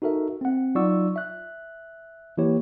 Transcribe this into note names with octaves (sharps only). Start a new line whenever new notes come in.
D#4 F#4 A4 A#4 E5
C4 F#5
F#3 D#4 F4 D5 C#6 E6
E5 F#6
E3 A#3 E4 G4 C#5